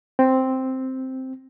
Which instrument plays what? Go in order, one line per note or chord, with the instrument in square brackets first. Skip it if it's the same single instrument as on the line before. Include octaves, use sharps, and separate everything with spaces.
[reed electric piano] C4